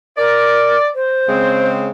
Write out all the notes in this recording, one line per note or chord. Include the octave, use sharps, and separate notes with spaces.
A#4 D5
C5
C#3 G#3 C4